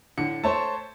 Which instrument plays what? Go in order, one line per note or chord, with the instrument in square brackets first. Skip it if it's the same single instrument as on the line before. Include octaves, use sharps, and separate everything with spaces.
[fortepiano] A2 D3 [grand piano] C#7
[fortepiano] A3 [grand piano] C5 C#5 A5